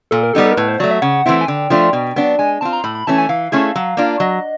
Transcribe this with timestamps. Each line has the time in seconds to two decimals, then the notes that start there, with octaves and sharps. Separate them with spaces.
0.11 A#2 A4
0.23 A#4
0.34 G3 B3 D#4 G4 A4
0.45 A4
0.52 A#4
0.57 A2 B4
0.68 C5
0.80 F#3 A3 D5
0.91 E5
1.02 C#3 F#5
1.26 E3 A3 C4 E4
1.41 G#5
1.47 D3 G5
1.70 F3 A3 D4 F4
1.93 B2
2.16 F#3 B3 D4
2.39 G#3 G#5
2.61 C4 F4 A5
2.73 A#5
2.84 A2 B5
2.95 B5
3.07 E3 A3 C#4 A5
3.18 G#5
3.29 E3 F5
3.52 A3 C#4 E4 G#4
3.75 F#3
3.97 A#3 D4 F4
4.20 F#3 D#5